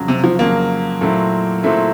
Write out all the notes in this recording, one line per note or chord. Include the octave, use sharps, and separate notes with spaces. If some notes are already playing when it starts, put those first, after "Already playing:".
Already playing: F2 C#3 F#3
C3
F3
F2 C#3 F#3 A#3
A#2 F#3 A3 C4 E4
A#2 F#3 A3 C4 E4